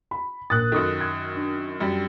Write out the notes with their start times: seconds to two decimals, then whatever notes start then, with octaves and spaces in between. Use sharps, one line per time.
0.11 B5
0.50 A#1 A#4 D#6 F#6 A6
0.72 F#2 D#3 A4 D#6
1.01 G#6
1.35 D4
1.80 F#2 G3